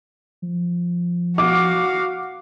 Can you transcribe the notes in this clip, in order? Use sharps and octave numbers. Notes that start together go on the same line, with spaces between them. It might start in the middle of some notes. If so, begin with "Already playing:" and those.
F3
F#4 F5 D6